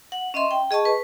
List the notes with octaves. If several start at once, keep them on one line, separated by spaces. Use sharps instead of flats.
F#5
C#4 D#5 E5 C6
G5
G#4 D#5 A5 C#6
B4